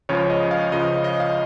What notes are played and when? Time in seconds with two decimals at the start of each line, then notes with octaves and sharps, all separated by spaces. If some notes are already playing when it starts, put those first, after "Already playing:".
0.09 C#2 C#3 F3 C#5
0.30 D#5
0.51 F5
0.72 C#2 C#3 F3 D#5
1.04 D#5
1.20 F5